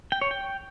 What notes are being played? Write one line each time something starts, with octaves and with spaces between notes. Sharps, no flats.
G5
C#5
G5